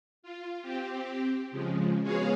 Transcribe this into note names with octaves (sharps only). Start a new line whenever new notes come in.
F4
C4 G4
C#3 F3 G#3
G#3 B3 F#4 G#4 C#5 F5